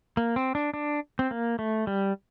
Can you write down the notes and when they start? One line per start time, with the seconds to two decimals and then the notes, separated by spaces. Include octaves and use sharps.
0.17 A#3
0.36 C4
0.55 D4
0.74 D4
1.19 C4
1.31 A#3
1.59 A3
1.87 G3